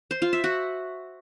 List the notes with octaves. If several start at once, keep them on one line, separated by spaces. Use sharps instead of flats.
C5
F4
E5
F#4